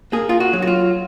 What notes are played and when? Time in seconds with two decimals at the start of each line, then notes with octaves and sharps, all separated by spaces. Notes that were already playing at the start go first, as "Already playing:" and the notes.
0.12 A#3 G#4
0.29 F4
0.40 F#4
0.53 F#3
0.62 F#4
0.67 F4